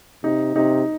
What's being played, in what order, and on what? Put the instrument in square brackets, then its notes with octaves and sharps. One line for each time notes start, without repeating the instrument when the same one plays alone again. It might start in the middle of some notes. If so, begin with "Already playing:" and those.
[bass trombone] C3 [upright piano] D#4
[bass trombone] C3 [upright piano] D#4